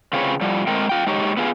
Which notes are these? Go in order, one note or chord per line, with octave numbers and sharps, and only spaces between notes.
C#3 C4 F4 G#4 B4 C#5
A2 F3 G3
A2 G#3 C4 A#4 G5
F4 G5
G#3 D#4 G4 C#5
B3 F4 G#4